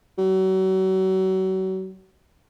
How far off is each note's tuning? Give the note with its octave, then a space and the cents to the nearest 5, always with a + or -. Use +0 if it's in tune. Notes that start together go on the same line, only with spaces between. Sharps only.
F#3 +35